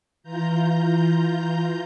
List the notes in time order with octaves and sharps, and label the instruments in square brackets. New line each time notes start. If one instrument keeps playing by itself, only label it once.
[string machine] E3 F4 A#5 G6